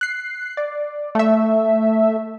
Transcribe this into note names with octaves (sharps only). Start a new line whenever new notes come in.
F#6 C7
D5
A3 E5